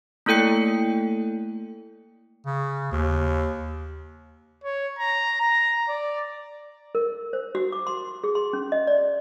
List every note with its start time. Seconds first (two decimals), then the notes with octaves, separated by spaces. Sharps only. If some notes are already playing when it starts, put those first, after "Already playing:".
0.26 A3 A#3 E4 A4 G5 C#7
2.46 C#3
2.92 D#2
4.64 C#5
4.99 A#5
5.41 A#5
5.88 D5
6.95 A#4
7.33 C5
7.55 F#4
7.72 D6
7.87 C6
8.24 G#4
8.35 C6
8.53 C#4
8.72 D#5
8.87 D5